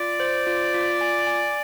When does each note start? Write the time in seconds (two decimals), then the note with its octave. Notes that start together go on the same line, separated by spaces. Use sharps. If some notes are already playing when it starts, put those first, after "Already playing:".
Already playing: F4 D5
0.20 C5
0.47 F4
0.74 F4
1.01 G#5
1.27 G#5